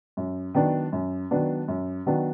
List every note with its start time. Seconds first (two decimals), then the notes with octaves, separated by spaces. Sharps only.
0.17 F#2
0.54 D#3 F#3 B3 D4
0.93 F#2
1.31 D#3 F#3 B3 D4
1.68 F#2
2.06 D#3 F#3 B3 D4